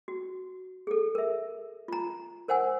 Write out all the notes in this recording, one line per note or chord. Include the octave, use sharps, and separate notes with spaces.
F#4
G#4 A4
A#4 E5
F4 A#5
A#4 C5 F#5 G#5 E6